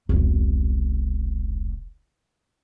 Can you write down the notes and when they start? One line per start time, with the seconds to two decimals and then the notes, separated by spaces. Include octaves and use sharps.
0.09 E1 C2